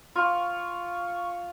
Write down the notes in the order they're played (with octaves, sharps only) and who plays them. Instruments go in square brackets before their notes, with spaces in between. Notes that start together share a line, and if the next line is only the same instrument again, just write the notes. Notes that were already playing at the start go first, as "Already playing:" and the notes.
[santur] F4 [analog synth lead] C#6